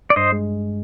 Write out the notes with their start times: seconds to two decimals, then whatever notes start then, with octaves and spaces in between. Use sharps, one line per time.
0.10 D5
0.16 G2 C5 D#5
0.32 G#3